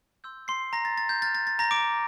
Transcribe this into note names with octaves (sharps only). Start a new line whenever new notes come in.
C6 E6 G6
C6 C7
A#5 A#6
A6
A6
G6
A#5 F6 A6
A6
A6
A#5 A#6
D6 D7